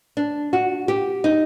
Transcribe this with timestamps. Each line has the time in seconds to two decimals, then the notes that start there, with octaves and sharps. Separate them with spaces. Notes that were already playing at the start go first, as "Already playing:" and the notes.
0.17 D4
0.53 F#4
0.88 G4
1.24 D#4